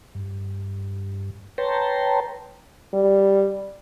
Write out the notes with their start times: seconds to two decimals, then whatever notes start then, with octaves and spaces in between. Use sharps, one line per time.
0.15 G2
1.58 B4 C#5 G5 A5 A#5 C6
2.94 G3